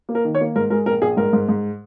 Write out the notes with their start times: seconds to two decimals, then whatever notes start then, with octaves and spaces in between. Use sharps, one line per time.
0.09 A#3
0.15 A#4
0.25 D#3
0.35 C#5
0.41 A#3
0.55 G#2 A#4
0.70 G#3 A#4
0.86 A#1 A#4
1.02 A#1 G#4
1.17 G#2 A#4
1.33 G#2
1.49 G#2